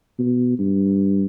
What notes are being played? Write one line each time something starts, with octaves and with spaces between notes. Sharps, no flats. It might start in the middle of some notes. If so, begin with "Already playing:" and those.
B2
G2